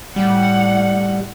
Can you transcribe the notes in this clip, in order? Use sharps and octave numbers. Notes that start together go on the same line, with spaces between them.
A2 G3 F#5